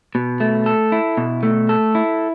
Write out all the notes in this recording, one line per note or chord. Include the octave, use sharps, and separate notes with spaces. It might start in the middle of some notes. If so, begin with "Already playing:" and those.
B2
A3
A4
E4
B2
A3
A4
E4